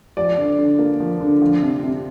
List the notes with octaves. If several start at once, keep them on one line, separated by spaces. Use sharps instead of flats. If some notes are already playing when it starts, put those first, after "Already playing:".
F3 D5
D3
D3
A#3
F3
D3
F3
C3
C3